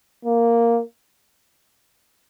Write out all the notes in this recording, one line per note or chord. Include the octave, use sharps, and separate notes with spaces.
A#3